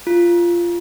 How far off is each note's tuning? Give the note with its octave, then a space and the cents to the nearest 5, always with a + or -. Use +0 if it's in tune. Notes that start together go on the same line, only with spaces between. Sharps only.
F4 -15